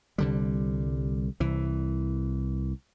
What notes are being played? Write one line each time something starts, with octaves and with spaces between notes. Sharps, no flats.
C2 D3 G3
C2 E3